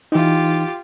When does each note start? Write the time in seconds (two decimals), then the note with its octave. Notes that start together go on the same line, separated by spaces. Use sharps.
0.12 E3 D#4 F4 G4